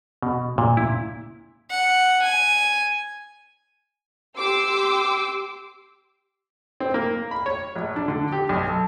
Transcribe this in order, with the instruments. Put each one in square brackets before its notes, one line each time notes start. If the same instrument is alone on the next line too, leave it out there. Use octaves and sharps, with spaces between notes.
[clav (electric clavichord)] B2
A#2
E4
[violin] F#5
G#5
[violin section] G4 C6 D6 E6
[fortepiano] C4
A#3
B5
C#5
A#1
D4
D3
G4
B1
A4